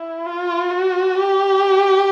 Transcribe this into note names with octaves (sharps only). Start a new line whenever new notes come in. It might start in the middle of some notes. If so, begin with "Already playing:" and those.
Already playing: E4
F4
F#4
G4